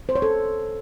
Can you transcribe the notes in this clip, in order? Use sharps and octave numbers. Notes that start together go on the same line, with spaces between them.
C5
C#5
A4